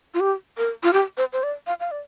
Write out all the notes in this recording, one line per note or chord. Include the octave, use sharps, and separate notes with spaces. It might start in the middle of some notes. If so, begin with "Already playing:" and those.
F4
G4
A#4
F4
G4
C5
C5
D5
F5
F5
D5